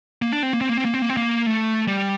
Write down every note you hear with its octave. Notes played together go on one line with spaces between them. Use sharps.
A#3
D4
C4
A#3
C4
A#3
C4
A#3
C4
A#3
C4
A#3
A3
G3